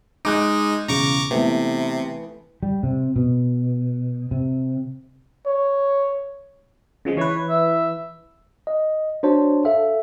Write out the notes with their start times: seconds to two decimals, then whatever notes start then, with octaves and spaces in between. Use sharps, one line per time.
0.25 G#3 D#4 D6 F#6
0.88 E1 C#3 A#5 C#6 D6
1.31 C3 E3 A3 B3
2.63 G3
2.83 C3
3.16 B2
4.31 C3
5.46 C#5
7.05 C#3 F3 G#3
7.17 E3 B4 C#5
7.49 E5
8.67 D#5
9.23 D4 F#4 C5 C#5 A5
9.65 A4 E5 F5